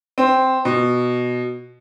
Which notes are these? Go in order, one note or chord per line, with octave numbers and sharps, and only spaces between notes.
C4
B2